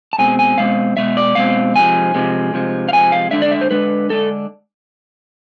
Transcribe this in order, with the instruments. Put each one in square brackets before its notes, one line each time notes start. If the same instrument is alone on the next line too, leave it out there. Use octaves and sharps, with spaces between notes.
[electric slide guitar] A5
B2 G#3 C4 G#5
G#5
B2 G#3 C4 F5
B2 G#3 E5
D5
B2 G#3 C4 F5
C3 F3 G#3 G#5
C3 F3 G#3
C3 F3 G#3
F5
C3 F3 G#3 G#5
F5
D3 G#3 D4 E5
D5
E5
C5
D3 G#3 D4 B4
D3 G#3 D4 A4